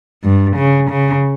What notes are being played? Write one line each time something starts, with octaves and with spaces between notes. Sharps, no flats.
G2
C#3
C#3